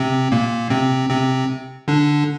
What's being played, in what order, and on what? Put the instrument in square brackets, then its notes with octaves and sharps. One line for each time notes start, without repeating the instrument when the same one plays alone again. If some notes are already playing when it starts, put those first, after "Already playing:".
Already playing: [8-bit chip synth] C3 C4
A#2 A#3
C3 C4
C3 C4
D3 D4